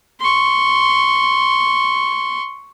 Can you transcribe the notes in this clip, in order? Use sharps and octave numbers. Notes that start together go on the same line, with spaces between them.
C6 C#6